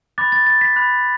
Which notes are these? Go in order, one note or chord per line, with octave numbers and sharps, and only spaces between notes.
B5 D6 F#6 A6
A6
A6
B6
B5 D6 F#6